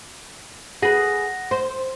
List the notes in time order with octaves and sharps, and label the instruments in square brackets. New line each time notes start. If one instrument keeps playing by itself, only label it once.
[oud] G#4 B4 [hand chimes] F#5 A#6
[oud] C5